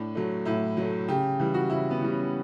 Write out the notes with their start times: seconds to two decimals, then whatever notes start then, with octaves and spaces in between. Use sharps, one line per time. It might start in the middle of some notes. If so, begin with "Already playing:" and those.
Already playing: A2 D4
0.15 F#3 A3
0.45 A2 E4
0.77 F#3 A3
1.08 C#3 G4
1.40 E3 G3
1.54 F#4
1.70 C#3 E4
1.91 B3
2.01 E3 G3
2.12 C#4